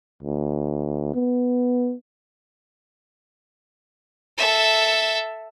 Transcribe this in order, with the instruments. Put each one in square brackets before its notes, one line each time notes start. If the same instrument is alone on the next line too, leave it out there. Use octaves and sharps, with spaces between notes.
[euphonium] D2
B3
[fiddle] A4 E5